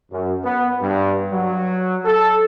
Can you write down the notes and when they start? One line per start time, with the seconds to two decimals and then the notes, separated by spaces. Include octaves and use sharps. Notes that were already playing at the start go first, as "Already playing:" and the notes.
0.11 F#2
0.43 B3
0.80 G2
1.31 F#3
2.05 A4